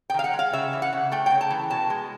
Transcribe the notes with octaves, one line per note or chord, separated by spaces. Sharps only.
G5
D#3 F5
F#5
G#3
F5
C#3 E5
E3
F#5
C#3
A3 G5
C#3 G5
A5
E3
B2 A5
G#3